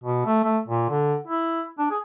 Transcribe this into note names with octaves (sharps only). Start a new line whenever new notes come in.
B2
A3
A3
A#2
D3
E4
D4
G#4